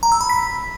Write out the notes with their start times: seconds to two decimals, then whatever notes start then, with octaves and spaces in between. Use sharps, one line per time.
0.03 A#5
0.12 E6
0.21 B5
0.30 B6